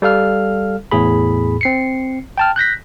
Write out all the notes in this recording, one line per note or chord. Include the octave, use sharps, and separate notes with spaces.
G3 A4 F5 F6
E2 A2 G#4 B5
C4 C7 C#7
G5 A5 F6
F#6 G6 A#6 B6